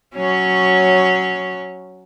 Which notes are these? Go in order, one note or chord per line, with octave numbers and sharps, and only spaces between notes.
F#3 C#4 C#5